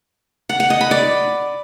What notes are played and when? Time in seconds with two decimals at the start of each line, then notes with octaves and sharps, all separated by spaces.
0.49 F#5
0.60 F#5
0.70 D#5
0.81 B5
0.91 D5